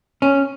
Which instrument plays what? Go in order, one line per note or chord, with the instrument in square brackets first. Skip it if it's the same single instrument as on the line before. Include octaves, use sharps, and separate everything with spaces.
[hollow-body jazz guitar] C#4